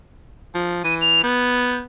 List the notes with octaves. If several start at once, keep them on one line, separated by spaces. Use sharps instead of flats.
F3
E3 D#7
F7
B3 G6